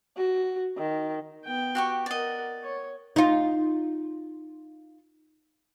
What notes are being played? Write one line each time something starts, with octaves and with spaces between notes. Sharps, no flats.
F#4
D#3
B3 G5
F#4 G4 C#6
A#4 D5 D#5 F#5
C#5
D#4 F4